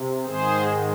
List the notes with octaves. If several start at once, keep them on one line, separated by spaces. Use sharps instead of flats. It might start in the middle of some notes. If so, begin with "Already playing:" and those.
Already playing: C3
G#2 D#3 G#3 G#4 C5